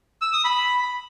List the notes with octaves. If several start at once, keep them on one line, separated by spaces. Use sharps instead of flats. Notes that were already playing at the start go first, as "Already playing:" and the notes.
E6
D#6
B5